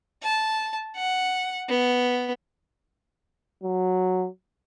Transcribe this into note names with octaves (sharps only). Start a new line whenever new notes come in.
A5
F#5
B3
F#3